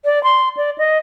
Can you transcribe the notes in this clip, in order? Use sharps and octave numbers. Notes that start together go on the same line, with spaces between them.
D5
C6
D5
D#5